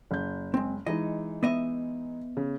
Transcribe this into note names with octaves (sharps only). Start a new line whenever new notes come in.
F#1 G6
G#3 C4
E3 G#3 D#4 D#5
B3 D#5 E5
C#3